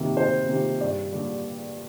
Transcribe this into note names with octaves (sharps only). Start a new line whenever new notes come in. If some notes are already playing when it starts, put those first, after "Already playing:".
Already playing: D2 C3 D#3 A#3
D2 C5
C3 D#3 A#3
G2 D5
D3 G3 A#3